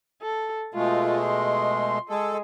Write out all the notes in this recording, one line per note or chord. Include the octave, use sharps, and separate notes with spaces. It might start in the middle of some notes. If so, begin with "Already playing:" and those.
A4
B2 G#3 A3 F4
C6
G#3 A4